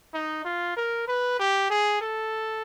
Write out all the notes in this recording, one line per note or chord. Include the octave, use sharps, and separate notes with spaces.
D#4
F4
A#4
B4
G4
G#4
A4